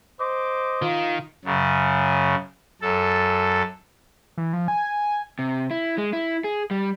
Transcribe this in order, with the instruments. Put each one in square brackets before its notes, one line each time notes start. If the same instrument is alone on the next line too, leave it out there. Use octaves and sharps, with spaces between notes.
[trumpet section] C5 D#5 D6
[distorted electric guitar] D#3 [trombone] F4
[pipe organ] F#2 C#3
F#2 A4
[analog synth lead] E3
F3
G#5
[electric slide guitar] C3
E4
G#3
E4
G#4
G3